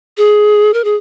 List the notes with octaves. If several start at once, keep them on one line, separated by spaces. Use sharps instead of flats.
G#4
A#4
G#4